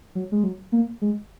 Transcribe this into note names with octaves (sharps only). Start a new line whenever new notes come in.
F#3
G#3
F#3
A#3
G#3